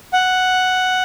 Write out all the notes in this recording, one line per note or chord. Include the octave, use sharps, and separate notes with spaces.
F#5